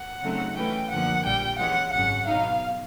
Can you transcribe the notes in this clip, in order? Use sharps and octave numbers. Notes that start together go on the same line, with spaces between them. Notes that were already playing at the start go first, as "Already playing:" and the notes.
Already playing: F#5
C#3 F#3 A3 C4 D#4
E3 A3 C#4 F#4 B4 G5
F#2 D3 F3 A#3 F#5
A#1 A#2 G3 G5
E3 G#3 C#4 F#5
G#1 F#2 C#3 F#5
B2 F#3 B3 D#4 F5